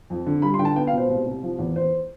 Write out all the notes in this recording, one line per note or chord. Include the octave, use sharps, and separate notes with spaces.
F2
D3
G3 B5
C6
D3 G5
A5
B3 G5
F5
B2 C5
C2
C2
F3
E2
E2 C5